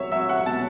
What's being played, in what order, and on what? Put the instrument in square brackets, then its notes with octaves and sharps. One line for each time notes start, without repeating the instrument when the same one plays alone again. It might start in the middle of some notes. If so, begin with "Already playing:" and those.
Already playing: [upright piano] F#3 C#5 E5
F#3 E5
F#5
B2 A5